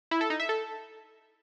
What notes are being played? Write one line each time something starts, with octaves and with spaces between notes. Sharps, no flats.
E4
A4
D#4
E5
A4